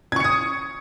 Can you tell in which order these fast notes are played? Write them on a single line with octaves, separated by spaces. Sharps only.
G#6 C#6 C#7 D#6